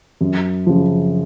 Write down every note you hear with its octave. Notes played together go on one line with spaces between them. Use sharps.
F#2
C#3 F3